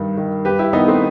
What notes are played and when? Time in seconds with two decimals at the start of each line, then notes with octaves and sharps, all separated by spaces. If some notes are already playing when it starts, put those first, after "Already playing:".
Already playing: G2 D#3
0.17 D#3
0.45 G2 G4 B4
0.59 E4 G4
0.73 D#3 B3 D#4
0.88 A3 C4